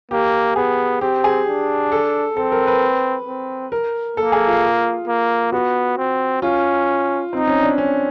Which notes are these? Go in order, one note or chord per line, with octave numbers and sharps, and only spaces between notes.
A#3 G4
B3 G#4
C4 G4
G#4
D4
A4
C4 A4
A#4
B4
C4
A#4
A#3 A4
G#4
F4
A#3
B3 F#4
C4
C#4 F4
C4 D#4
C#4
D4
C#4